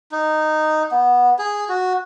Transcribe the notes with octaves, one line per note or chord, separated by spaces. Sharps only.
D#4
B3
G#4
F#4